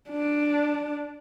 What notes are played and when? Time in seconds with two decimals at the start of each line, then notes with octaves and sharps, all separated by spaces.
0.10 D4